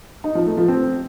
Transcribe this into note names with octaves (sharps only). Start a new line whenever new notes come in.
D#4
F3
A3
F3
C4